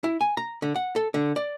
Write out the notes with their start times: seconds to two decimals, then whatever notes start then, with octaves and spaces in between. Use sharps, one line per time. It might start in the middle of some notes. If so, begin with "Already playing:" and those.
0.04 E4
0.21 G#5
0.37 A#5
0.62 D3
0.76 F#5
0.96 A4
1.14 D3
1.36 D5